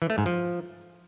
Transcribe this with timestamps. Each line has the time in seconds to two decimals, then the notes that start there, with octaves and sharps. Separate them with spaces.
0.02 E3
0.10 A3
0.18 G#2
0.26 F3